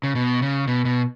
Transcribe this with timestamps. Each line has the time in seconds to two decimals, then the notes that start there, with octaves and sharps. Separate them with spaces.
0.03 C#3
0.15 B2
0.42 C#3
0.68 B2
0.85 B2